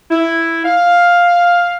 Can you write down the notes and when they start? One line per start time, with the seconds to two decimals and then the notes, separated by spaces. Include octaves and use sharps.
0.11 E4
0.65 F5